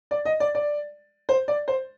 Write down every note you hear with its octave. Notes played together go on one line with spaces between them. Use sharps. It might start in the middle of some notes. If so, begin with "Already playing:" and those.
D5
D#5
D5
D5
C5
D5
C5